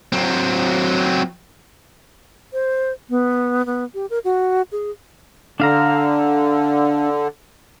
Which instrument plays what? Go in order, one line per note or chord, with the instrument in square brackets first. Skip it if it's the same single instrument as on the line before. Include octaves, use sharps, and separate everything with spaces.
[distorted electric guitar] F#3 C4
[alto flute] C5
B3
B3
G4
A#4
F#4
G#4
[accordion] D3 [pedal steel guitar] D4 F5 A#5